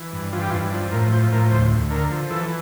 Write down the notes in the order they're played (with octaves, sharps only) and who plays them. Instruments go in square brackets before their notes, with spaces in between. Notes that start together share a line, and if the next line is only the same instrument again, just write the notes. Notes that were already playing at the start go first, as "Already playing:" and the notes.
Already playing: [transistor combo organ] E3
G2
E3 F4
G4
F4
G2
F3 D4
A2 A#4
F3 C5
A2 A#4
D2 C5
D2
D3 A#4
F3
E3 A4